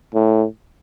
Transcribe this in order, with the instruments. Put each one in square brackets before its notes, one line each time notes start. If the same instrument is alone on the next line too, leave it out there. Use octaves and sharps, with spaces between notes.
[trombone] A2